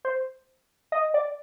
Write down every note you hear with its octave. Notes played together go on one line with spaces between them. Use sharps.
C5
D#5
D5